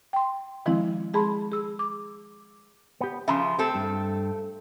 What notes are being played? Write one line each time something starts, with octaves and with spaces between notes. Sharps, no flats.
G5 C6
D#3 F3 G#3 C4 E4
G#3 G#4 A5 B5 C6
G#4 E6
D6
B3 G4
C#3 F3 E5 A#5 C6
A3 C4 G4 A4
G2